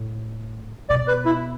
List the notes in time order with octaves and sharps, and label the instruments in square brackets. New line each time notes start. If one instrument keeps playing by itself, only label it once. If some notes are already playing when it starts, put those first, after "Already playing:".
Already playing: [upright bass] A2
[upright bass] B2 [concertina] D5
[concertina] B4
E4